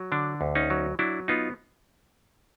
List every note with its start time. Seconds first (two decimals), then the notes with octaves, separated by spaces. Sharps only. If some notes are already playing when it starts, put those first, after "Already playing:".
Already playing: F#3
0.12 D3 D4
0.41 D2
0.55 C#4 D#4
0.70 F#3
0.99 F#3 D4 E4
1.28 B3 D#4 F4